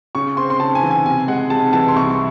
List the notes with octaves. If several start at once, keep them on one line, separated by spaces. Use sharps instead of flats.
C#3 C#6
C4 C6
C6
C#3 A5
G#5
E3
G#5
C3 G#5
G#3 F#5
C3 A5
E3 A5
C6
C2 C#6